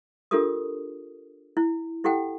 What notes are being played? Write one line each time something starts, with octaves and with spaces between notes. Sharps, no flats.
D4 F4 G4 A4 A#4 D#6
E4
E4 G4 A4 F#5 G5